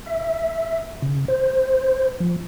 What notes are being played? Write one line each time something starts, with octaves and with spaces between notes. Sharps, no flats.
E5
C#3
C5
F3